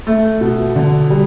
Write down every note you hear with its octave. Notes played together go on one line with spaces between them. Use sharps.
A3
B2
D3
G3